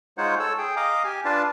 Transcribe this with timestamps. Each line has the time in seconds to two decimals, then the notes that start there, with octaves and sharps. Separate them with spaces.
0.18 G#3 D#4 F4 C5 C#5 F#5
0.40 A4 C#5 E6
0.58 G#4 G5
0.76 D#5 F5 A#5 D6 D#6
1.04 G4 G#5
1.25 D4 F4 B4 D5 F5 A5